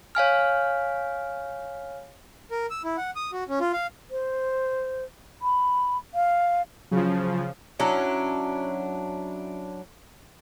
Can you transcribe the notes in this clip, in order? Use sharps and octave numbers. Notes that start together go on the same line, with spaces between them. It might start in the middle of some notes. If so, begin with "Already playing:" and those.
C#5 F5 G#5 F6
A#4
E6
E4
F#5
D#6
F#4
C#4
F4
F5
C5
B5
F5
C#3 F3 F#3
F#3 C#4 D4 E4